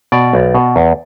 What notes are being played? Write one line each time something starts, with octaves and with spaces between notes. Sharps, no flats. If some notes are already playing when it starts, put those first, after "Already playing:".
B2 D5
B1
B2
E2